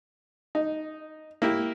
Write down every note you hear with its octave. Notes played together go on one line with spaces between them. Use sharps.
D#4
A#3 E4 G4